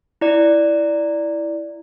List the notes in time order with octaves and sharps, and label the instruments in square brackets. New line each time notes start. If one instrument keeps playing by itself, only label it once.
[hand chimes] E4 D5